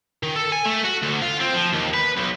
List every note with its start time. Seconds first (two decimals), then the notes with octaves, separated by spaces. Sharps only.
0.23 D#3
0.36 A4
0.52 G#5
0.66 A3
0.84 F#4
1.03 D2
1.22 F4
1.40 C4
1.53 F3
1.73 D#2
1.94 B4
2.17 B1